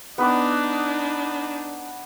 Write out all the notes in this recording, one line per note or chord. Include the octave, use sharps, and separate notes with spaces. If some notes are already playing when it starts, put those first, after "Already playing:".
B3 D4 D#4 B4 D6